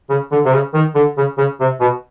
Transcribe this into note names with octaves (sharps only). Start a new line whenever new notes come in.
C#3
D3
C3
C#3
D#3
D3
C#3
C#3
C3
B2